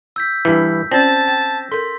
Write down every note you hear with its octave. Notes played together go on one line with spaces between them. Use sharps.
E6 G6 B6
G2 E3
C4 C#4 F4 D5 A5 A6 A#6
G5
A4 A#4 C6 B6